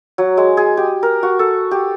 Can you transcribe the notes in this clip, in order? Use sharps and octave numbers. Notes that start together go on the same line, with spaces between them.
F#3
G#3
G#4
G4
A#4
F#4
A4
G4